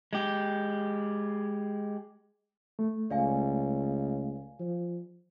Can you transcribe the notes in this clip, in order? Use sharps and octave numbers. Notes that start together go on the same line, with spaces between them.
G#3 G4
A3
C#2 D5 F5 G#5
F3